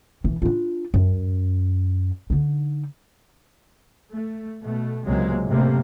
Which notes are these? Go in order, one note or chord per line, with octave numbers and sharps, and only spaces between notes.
E1 E3
D4 F4
F#2
D3 D#4
A3
B2 A3
C#2 C3 F#3 G#3 A#3
F#2 A2 C3 A3 A#3